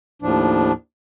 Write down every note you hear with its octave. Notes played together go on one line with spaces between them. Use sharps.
D#2 A2 F3 D4